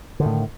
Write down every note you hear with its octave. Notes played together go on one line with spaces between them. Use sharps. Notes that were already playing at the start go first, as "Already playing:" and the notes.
A2 D3 D#3